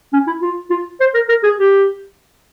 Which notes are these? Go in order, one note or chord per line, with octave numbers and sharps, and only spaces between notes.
C#4
E4
F4
F4
C5
A#4
A#4
G#4
G4